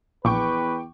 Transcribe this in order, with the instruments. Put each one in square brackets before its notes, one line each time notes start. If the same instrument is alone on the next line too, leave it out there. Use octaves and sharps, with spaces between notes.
[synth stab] A#1 [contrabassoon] E2 [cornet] B4 [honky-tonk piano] G5 C#6 D6